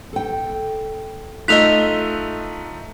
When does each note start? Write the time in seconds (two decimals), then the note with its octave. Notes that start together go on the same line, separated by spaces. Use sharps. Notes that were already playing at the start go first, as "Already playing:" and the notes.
0.13 A4 G5
1.48 A3 D#4 F4 D#5 E6 F#6 B6 F7